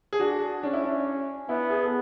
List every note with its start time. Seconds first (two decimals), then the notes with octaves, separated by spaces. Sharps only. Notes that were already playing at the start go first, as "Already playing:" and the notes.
0.13 G#4
0.19 D4 F#4
0.63 C#4 D4
0.73 E4
0.84 D4
1.49 B3 E4
1.70 G#4
1.83 A4